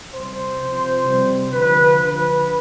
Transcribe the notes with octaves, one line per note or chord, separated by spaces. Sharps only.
C3 G3 C5
C3 F3
C3 G3
D3 F3 B4
D3 F3 B4